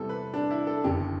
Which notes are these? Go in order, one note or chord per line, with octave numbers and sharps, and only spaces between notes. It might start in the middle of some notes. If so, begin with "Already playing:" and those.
Already playing: E2 C3 G3 A4
B4
D4
E4
A4
F#1 E2 D3 G4